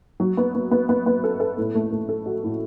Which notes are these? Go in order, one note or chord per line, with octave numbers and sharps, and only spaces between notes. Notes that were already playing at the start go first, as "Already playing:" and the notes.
F#3
B3
B3
B3
B3
B3
A4
A4
A2
A3
A3
A4
F#4
A2